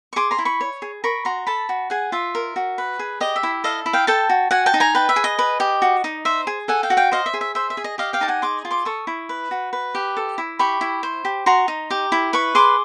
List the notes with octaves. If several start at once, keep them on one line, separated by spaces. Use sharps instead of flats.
C#6
G#4 C6 D6
A#5 C6
E4
B5 C#6
C#5
G#4
A#4 B5 C#6
F#4 A#5 C6
A4 A5 B5
F#4
G#4 F#5 G#5
F4 E5
A#4
F#4
B4
G#4
G4 D#5
E5
E4
A4 D#5 F5
E4
F5 G5
A4 G5 A5
F#4
F#4 F#5 G#5
G5 A5
D#4
G#5 A#5
B4 G5 A5
E5
G#4
D#5
B4
G4
F#4
D#4
C5 E5
G#4
A4 F#5 G#5
F5 G5
F#4
F5 G5
C5 D#5 F5
E5
G#4
E5
C5 E5
E5
G#4
D#5
G4 D#5 F5
F5 G5
D#4 A5
F#5 G#5
G#4 C6 D6
F4
C6 D6
A4 C#6 D#6
E4
B4
F#4
B4
G4
A4
E4
G4 B5 C#6
E4
C5
G4
F#4 A#5 C6
D#4
G4
E4
B4 B5 C#6
G#4 C6 D6